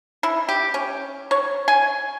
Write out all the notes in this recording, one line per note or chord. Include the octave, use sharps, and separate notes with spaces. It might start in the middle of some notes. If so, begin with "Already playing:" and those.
E4
G4
C#4
C#5
G#5